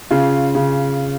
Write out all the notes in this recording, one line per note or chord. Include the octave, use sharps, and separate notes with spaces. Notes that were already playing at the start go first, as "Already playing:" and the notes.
C#3 F4
C#3